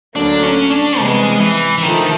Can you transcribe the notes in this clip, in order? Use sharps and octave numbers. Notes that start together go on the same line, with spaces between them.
D2 D3 F#3 A#3 D4
C#4
D4
C3 E3 G3 G#3 B3
E3
E3
D3 D#3 F3 A3